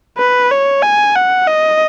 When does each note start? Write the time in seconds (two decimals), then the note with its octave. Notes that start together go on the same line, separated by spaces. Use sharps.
0.18 B4
0.51 C#5
0.82 G#5
1.15 F#5
1.47 D#5